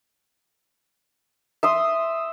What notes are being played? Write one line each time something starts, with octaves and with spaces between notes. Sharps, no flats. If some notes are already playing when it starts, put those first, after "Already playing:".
E5 C6 D#6